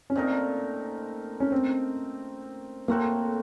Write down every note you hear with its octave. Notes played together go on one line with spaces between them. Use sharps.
C#4
A#2 A3 C4 D#4 A#4
C#4
C4
A2 A3 A#3 C4 F#4